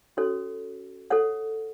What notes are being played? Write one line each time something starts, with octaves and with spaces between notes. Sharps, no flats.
C#4 F#4 A4 C#5
A4 C#5 F#5